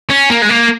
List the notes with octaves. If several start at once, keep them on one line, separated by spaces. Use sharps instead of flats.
C#4
A#3
G#3
A#3